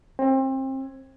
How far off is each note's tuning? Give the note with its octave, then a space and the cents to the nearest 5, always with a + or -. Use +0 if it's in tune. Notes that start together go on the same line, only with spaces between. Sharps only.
C4 +30